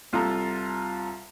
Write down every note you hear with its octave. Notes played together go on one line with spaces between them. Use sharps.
C2 F4 A4 A#5